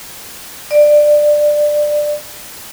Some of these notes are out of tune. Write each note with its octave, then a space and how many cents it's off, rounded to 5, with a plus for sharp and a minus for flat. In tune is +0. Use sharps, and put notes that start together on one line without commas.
D5 +15